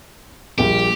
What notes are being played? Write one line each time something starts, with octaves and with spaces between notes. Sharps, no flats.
A#1 A#2 G3 A#3 G4